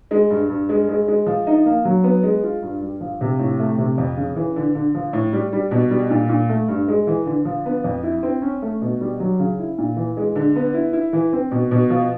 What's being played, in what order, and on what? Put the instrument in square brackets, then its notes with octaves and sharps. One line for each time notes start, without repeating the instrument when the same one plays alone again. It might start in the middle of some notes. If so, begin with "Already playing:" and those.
[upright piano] G#3
G2
G2
G#3
G#3
G#3
F3
D#4
A#3
F#3
B3
G#3
F4
G2
G3
F3
C3
A2
A3
C3
F2
C#3
E3
D3
D3
F3
A2
G3
G3
B2
G3
A#2
A#2
A3
G2
G#3
E3
D3
F3
B3
F2
E4
C4
C#4
A3
B2
G3
F#3
C#3
E4
A#2
E3
G#3
D3
B3
E4
E4
E3
C4
B2
B2
F3